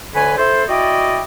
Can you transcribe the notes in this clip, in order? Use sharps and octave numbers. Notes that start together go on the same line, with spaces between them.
D2 D3 B4 C#5 G#5
E4 A4 C5
E4 F#4 D5 D#5 G5